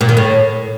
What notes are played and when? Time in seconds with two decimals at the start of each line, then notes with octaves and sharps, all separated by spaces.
0.01 A#2
0.09 D#3
0.17 A2